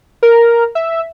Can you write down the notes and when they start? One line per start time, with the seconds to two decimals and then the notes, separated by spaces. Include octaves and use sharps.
0.23 A#4
0.75 E5